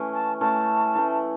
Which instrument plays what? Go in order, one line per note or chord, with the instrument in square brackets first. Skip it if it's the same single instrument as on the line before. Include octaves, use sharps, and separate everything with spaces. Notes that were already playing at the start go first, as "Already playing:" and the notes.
Already playing: [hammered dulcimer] E3 A3 C#4
[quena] A5
[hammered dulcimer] E3 A3 C#4 [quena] A5
[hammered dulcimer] E3 A3 C#4